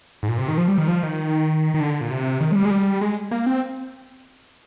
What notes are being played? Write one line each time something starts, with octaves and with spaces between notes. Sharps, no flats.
G#2
A#2
C3
D#3
F3
G3
D#3
F3
D#3
D#3
D3
A#2
C3
D#3
G#3
G3
G#3
G3
G#3
A#3
C4